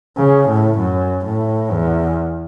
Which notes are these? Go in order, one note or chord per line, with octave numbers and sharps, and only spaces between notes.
C#3
A2
F#2
A2
E2